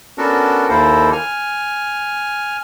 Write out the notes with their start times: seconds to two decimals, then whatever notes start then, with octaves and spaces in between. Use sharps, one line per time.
0.18 B3 C#4 D4 F#4 A4 A#4
0.69 D#2 A#3 E4 A4 C5
1.13 G#5 F6